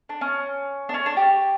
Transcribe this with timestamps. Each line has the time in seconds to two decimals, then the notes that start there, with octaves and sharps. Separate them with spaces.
0.09 D4
0.21 C#4
0.89 D4
0.94 C#4
1.06 D4
1.17 G4